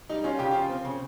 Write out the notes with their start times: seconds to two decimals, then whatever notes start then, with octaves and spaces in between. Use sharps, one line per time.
0.09 G3 D#4
0.24 C#4 F4
0.39 C#3 G4
0.51 F3 F4
0.69 C4
0.85 C#3